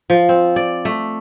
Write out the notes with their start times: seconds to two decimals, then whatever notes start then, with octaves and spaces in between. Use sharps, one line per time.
0.10 F3
0.29 C4
0.56 D5
0.85 A3